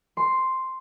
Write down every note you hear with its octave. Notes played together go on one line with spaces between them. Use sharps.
C6